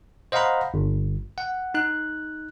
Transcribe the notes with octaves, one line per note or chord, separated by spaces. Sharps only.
C5 D#5 F5 F#5 A#5 B5
G1
F#5
D#4 F#6